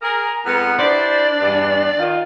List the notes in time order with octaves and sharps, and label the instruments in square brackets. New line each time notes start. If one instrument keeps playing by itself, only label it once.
[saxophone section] G#4 A#4 [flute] A#5
[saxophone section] F2 G#3 B3
[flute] D4 [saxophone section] E4 G4 C5 [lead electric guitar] D5
[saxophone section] E2 G2
[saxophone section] D#3 [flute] F4